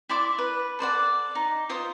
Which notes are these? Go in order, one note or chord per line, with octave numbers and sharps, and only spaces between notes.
E4 D5 C6 D6
B4
A4 C5 D5 F#5
D#4
F4 C5 D#6